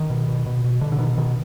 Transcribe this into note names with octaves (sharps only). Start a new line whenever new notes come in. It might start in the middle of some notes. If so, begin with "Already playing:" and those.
Already playing: D#3
B2
B2
B2
B2
B2 D3
D3
B2 D#3
B2 D#3